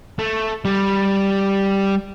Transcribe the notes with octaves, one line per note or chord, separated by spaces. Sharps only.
A3
G3